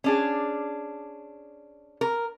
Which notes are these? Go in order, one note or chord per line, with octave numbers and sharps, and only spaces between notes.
C#4 D4 G#4
A#4